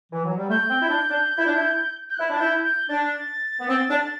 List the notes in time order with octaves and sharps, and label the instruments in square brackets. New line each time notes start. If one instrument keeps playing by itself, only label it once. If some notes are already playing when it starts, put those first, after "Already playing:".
[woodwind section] E3
F#3
G3
[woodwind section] A3 [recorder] G6
[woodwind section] C4
E4
D4
D4
E4
D4
E4
[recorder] G6
F#6
[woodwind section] E4
D4
[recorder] A6
[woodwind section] E4 [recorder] G6
[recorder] G6
[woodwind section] D4 [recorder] A6
[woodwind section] B3
C4
D4